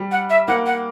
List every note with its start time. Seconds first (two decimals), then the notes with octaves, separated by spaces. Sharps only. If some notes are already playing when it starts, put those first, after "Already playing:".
Already playing: G3
0.11 F#5
0.30 E5
0.48 A#3 F#5
0.66 F#5